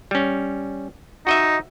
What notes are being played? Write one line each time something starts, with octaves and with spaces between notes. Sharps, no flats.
G3 C#4
D#4 F#4 D#5 E5